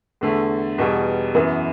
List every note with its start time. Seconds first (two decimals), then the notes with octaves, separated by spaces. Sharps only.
0.21 E2 D3 A3
0.78 E2 B2 G3
1.35 F#2 E3 B3